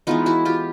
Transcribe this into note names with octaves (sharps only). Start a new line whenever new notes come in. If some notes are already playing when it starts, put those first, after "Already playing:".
E3 G#3 B3 D#4 F4
E4 F#4
F4 G4